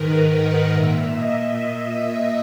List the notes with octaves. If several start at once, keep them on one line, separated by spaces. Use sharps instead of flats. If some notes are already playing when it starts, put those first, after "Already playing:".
Already playing: G#2 D#3 A#4 B4
F#5
A#2 E5
D#5
E5